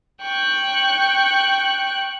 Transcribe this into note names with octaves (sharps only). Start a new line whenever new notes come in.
G5 C#6 F#6